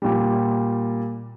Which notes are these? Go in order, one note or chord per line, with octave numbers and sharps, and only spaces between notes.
A#2 G3